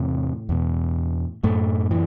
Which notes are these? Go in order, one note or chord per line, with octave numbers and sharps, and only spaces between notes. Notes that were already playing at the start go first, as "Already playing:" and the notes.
Already playing: E2 A2 C3 A3
E2 B2
F#2 A2 A3
E3